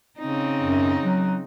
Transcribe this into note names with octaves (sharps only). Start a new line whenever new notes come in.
C#3 C4 D#4
F#2
F#3